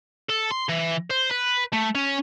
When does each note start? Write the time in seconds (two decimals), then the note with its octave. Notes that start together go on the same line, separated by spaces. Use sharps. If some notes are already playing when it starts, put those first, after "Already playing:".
0.30 A4
0.52 C6
0.69 E3
1.11 C5
1.31 B4
1.73 A3
1.95 C#4